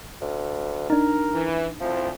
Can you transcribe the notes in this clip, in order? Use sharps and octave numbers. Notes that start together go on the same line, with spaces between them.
D2
D4 D#4 A#4
E3
D2 F3 C4 E4